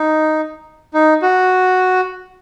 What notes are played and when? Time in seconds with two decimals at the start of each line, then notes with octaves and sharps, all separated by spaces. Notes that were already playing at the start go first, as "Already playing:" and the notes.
Already playing: D#4
0.94 D#4
1.22 F#4